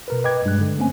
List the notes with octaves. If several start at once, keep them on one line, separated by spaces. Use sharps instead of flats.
B2 A#4 B4
B4 D#5 G5 D6 G#6
G2 G#3 F#6
D3
A3 A#3 C4 C#4 G#5